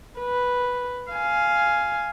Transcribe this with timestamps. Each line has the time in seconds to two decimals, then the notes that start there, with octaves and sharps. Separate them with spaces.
0.19 B4
1.11 F5 G#5